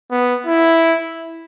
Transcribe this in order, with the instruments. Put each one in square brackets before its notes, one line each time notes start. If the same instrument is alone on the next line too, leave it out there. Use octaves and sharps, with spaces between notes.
[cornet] B3
E4